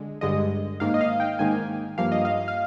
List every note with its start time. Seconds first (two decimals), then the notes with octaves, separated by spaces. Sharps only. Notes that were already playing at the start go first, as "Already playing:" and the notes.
Already playing: D3 G#3
0.21 G2 D3 G#3 D#5
0.80 G#2 D#3 A#3 F5
0.94 D#5
1.01 F5
1.20 G5
1.39 G#2 D#3 A#3 G#5
1.98 G2 F3 A#3 F5
2.12 D#5
2.25 F5
2.48 F5